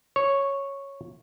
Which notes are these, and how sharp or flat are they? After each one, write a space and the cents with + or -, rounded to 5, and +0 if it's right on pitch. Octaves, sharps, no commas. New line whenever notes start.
C#5 -5